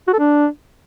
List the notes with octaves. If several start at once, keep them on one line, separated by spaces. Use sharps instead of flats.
F#4
A4
D4